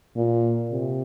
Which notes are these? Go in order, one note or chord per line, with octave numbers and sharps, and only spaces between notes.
A#2
C3